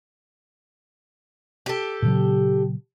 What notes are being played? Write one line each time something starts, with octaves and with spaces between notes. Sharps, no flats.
G4 A4
A#2 C#3 F#3